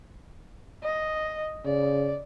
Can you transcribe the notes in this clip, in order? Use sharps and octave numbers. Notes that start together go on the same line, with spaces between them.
D#5
C#3 D5